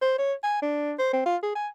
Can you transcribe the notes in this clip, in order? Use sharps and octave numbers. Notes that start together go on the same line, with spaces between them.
C5
C#5
G#5
D4
C5
C4
F4
G#4
G#5